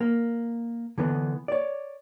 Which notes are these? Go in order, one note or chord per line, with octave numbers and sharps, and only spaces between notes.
A#3
D3 E3 B3
C#5 D5